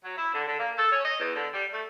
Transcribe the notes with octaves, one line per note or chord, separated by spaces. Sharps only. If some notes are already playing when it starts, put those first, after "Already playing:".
F#3
E4
D3
D3
A#3
A4
C#4
D#5
E2
D3
G3
A3